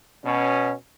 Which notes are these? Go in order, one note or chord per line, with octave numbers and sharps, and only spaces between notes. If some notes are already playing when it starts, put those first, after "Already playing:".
B2 C#4